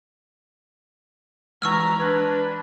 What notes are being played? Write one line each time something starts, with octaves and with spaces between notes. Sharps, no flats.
E3 G#3 B4 A#5 C#6 E6 F6
D4 B4 C6 F#6 G#6